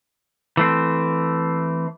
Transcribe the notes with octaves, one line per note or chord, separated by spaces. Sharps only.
E3 A3 C4